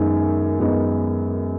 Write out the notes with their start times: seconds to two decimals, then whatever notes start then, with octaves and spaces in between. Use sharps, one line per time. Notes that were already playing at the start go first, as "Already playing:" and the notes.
Already playing: F#2 D#3 G#3 B3 D#4
0.60 F#2 D#3 G#3 B3 D#4